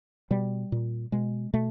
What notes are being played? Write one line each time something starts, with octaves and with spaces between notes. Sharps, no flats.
B2 G3
A#2
B2 G#3
B2 A3